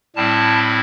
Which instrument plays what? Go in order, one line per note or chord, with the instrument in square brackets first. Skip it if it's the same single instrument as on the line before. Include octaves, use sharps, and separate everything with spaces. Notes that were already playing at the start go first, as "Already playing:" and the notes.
[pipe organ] A2 G3 C4 E4 A5